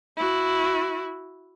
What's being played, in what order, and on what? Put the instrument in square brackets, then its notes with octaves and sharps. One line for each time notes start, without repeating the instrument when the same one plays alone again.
[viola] E4 F#4